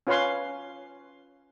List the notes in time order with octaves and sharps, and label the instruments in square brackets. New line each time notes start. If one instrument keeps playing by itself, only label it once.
[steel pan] C#4 F4 B4 C#5 F5 C6